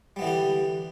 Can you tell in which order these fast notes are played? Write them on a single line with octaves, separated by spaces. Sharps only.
G3 B3 E3 D3 G4